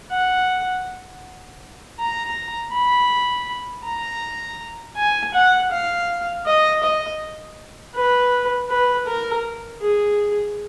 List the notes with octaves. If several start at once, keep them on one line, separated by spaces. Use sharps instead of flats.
F#5
A#5
B5
A#5
G#5
F#5
F5
D#5
D#5
B4
B4
A#4
G#4